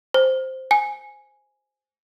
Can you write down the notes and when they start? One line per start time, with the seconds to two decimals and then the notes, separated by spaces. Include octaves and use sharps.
0.14 C5
0.71 G#5